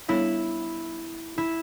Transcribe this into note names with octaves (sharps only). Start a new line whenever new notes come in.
G3 B3 D4 E4 A4 C#5
E4